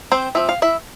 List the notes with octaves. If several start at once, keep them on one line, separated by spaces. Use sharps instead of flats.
C4 C5
F3 C4 E5
F5
E4 E5